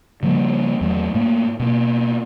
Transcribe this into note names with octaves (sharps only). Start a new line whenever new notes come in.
C#3 F3 G3 A#3
E2 F#3 G#3 A3
A2 A3 A#3
B2 A#3